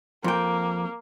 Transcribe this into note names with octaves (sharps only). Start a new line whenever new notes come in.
F2 A#3 G5